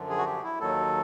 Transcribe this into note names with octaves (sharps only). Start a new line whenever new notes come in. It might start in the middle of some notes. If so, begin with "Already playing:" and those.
Already playing: F#2 D3 F3
G#4
F#4
G4
E4
D#2 D#3 F#3 A4